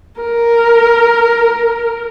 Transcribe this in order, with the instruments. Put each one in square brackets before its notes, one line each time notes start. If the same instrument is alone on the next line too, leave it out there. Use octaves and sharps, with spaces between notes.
[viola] A#4